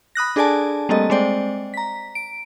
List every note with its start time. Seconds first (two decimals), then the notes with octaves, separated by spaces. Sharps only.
0.15 B5 D#6 F#6 A#6
0.36 D4 G#4 A4 D5 G#5 A5
0.89 G3 A3 A#3 C4 A4 D#5
1.10 G#3 C4 C5 D5 G5
1.74 A#5 B6
2.15 D7